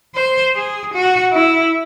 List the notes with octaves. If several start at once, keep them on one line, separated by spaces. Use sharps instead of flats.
C5
G#4
F#4
E4